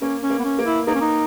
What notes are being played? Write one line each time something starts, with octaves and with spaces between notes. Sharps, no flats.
A#3 C#4
C#4
A#3
B3
C#4
A#3
E4
A#3 D#4
C#4
D#4